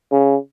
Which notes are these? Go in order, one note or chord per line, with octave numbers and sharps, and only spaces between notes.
C#3